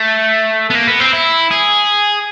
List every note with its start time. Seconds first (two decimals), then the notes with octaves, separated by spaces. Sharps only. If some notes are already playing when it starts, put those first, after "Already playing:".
Already playing: A3
0.70 B3
0.75 A#3
0.88 B3
1.00 C4
1.13 E4
1.51 G#4